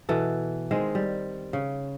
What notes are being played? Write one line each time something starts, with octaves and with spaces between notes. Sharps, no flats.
B2 E3 A4
D#3 G#3 C4
G3
C#3